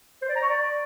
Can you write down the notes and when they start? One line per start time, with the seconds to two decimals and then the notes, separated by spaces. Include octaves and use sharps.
0.22 C5
0.29 D5
0.35 A#5
0.42 C#6
0.49 D5